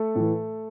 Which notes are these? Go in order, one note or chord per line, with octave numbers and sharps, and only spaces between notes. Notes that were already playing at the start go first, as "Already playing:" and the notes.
Already playing: A3 A4
A2 E3